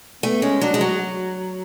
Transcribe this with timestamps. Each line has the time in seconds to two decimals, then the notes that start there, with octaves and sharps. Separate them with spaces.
0.23 A3 B3
0.42 G#3 C#4
0.61 F#3 D4
0.74 G#3
0.81 F#3 F#4